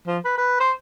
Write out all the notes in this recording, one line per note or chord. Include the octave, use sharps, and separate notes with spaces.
F3
B4
B4
C5